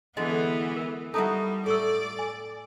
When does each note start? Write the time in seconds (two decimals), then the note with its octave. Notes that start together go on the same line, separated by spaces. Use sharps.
0.17 D3 E3 G#3 B3 D#5
0.76 A#4
1.14 G3 D#4 E4 F#4 A4 A5 D#6
1.66 A2 A4 D5 C#6 E6
2.19 G#5